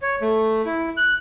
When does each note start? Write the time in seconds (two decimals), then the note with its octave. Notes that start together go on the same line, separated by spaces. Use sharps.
0.02 C#5
0.22 A3
0.65 E4
0.97 F#6